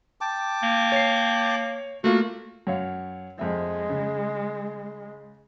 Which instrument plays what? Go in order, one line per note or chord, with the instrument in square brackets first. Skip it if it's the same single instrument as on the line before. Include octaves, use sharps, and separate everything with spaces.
[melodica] G5 A5 D6
[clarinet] A#3
[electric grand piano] C#5 C7
[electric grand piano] A3 A#3 F4 [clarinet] F#4
[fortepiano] F#2 C#5 F5
[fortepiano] F2 E5 [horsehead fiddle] G#3
[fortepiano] C#3